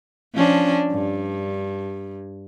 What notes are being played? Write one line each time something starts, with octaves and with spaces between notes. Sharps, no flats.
F3 C#4 D4
G2